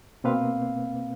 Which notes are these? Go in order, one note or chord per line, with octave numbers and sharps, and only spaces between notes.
B2 A#3 C4 B4 F5